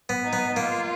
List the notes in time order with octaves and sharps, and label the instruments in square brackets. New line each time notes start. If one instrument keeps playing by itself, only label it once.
[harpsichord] B3
[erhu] D#4
[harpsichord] B3
[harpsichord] A#3 [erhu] F4